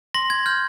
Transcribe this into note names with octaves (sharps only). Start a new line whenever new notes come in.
C6 A#6
G#6
F6 G6